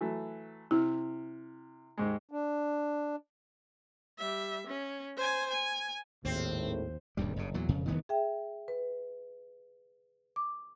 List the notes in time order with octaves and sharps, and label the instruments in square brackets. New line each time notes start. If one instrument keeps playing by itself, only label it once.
[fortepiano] E3 F#3 A3
[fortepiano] C3 F6 [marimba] E4
[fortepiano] D#2 G#2 G#3
[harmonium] D4
[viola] G3 E5
C#4
C5 G#5
G#5
[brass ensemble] G#1 A2 [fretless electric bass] D#2 [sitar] C4
[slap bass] D#1 D2 G2 G3
F#1 G2 C#3
E2 A#2 F#3
E1 F2 C#3
E1 D#3 E3 B3
[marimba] G#4 E5 G5
B4
D6